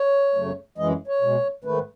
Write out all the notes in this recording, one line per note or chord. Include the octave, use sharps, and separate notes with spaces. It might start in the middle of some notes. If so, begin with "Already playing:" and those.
Already playing: C#5
F#2 C#3 F#3 A3
F#2 E3 G#3 D#5
C#5
B2 G#3
G#2 D#3 A3 B4